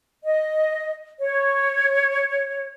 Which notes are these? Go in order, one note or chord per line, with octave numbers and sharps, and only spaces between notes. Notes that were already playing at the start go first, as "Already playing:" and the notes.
D#5
C#5